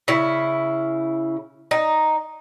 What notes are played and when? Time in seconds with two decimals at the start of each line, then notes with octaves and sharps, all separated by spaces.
0.08 C#3 E4
1.71 D#4